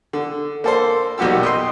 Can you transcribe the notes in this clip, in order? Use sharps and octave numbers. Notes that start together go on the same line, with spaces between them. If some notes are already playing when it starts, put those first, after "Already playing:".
D3
A#3 A4 C5
B1 A#2 F#4 G4 E6
D#5 G5 C6